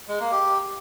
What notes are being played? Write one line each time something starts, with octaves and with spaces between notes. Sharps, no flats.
G#3
A#3
G4